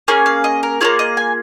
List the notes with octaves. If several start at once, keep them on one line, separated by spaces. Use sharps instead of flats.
A#3 C#4 G#4 G#5
F5
D#5
A#4
A#3 C#4 F4 G#4 C#5
D#5
G#5